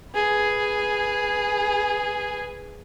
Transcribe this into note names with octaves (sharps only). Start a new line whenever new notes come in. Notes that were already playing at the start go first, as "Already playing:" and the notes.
G#4 B4